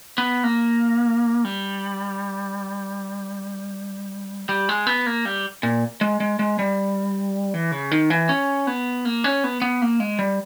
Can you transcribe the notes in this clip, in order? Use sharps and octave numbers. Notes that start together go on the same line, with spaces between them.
B3
A#3
G3
G3
G#3
B3
A#3
G3
A#2
G#3
G#3
G#3
G3
E3
C#3
D#3
E3
C#4
B3
A#3
C#4
B3
B3
A#3
G#3
G3